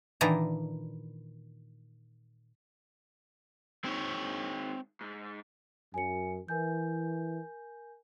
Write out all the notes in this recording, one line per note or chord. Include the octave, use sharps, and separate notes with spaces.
A#2 D#3 E3 D4 D#4 A#5
D#3 G#3 C4 C#5
G#2
F#2 G#5 C#7
E3 A#4 G#5 G6